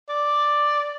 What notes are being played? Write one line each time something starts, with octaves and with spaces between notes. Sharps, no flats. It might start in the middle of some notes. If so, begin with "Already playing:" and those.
D5